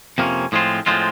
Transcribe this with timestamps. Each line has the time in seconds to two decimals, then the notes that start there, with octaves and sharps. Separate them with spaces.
0.18 F2 C3 F3 A#3 C#4
0.52 A2 F3 G#3 C4 F4
0.86 A2 F3 G#3 C4 F4